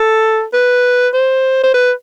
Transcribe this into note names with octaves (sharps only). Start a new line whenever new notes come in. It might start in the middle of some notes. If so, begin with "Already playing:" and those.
Already playing: A4
B4
C5
C5
B4